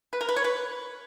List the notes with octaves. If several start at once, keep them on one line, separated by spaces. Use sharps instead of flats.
B4
A#4
B4
C#5
B4